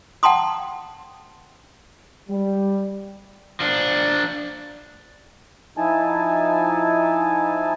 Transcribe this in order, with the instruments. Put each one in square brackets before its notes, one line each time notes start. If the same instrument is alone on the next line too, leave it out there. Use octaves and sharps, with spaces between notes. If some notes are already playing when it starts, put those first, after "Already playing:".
[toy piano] F#5 G5 A5 A#5 C6 D#6
[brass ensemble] G3
[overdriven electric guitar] F3 D4
[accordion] F3 D#4 E4 G#5 A5